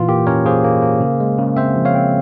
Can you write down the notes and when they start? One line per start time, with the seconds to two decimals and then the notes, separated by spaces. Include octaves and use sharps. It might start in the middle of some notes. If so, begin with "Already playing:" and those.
Already playing: A#2 E3 F4
0.08 A#3 G4
0.27 C#4 A#4 C#5
0.45 A#3 G#4 C5
0.64 A#3
0.82 A#3
1.01 C#3
1.20 G#3
1.38 C#3
1.57 C4 C5 E5
1.76 F3
1.85 C#5 F5
1.95 C4